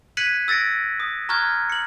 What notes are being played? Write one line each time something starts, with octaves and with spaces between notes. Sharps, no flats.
F#6 G#6 B6 C#7 D#7 F#7
E6 A6 A#6 C#7 D7
D#6
A#5 C#6 D#6 F6 F#6 G#6
C#7 F#7